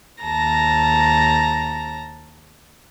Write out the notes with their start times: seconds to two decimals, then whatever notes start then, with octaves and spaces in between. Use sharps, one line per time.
0.22 D#2 A5 A#5 A#6